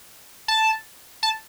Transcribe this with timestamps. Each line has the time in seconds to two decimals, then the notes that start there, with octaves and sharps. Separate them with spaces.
0.48 A5
1.23 A5